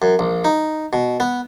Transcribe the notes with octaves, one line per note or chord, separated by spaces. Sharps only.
F#2
A#1
D#4
B2
B3